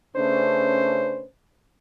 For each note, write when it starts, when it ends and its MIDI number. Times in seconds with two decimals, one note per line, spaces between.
0.16 1.24 49
0.16 1.24 57
0.16 1.24 61
0.16 1.24 62
0.16 1.24 71
0.16 1.24 72